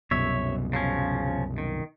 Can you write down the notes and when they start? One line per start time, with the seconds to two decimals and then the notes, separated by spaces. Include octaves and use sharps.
0.11 C2 F#2 B2 C#5 E5
0.73 C#3 F3 C#4
1.58 D#3